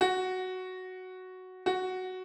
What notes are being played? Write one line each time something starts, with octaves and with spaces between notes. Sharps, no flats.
F#4
F#4